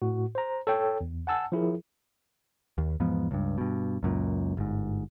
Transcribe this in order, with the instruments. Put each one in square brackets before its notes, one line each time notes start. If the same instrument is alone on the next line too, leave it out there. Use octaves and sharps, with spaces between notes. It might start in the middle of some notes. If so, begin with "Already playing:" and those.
[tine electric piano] A2 F#4
C5 A#5
A4 C#5 G5
E2
F#5 G#5 A5 E6
F3 E4 G#4 A#4
[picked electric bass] D#2
E2 G#2 F3 B3
C#2 G2
G2 B2
C#2 F#2 A#2
G1 G#2